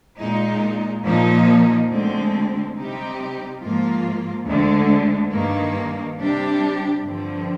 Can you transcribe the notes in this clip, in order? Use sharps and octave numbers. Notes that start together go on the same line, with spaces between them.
A#2 G#3 D#4
A#2 F3 A#3 D#4
D2 D3 G#3 C4
C3 G3 C4 D#4 G4
G#2 F3 A#3 F4
D2 D3 G#3
G2 D#3 A#3
C3 G3 D4 G4
G2 D3 F3 C4